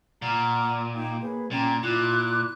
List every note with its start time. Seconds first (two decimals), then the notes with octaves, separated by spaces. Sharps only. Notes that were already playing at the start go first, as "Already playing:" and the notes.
0.22 A#2 F#5 A#5 F6
0.95 D#4 G5
1.22 A#3 G#4 B4 C#5
1.51 A#2 C#4 G5 A#5
1.83 A#2 E4 F4 D6 F#6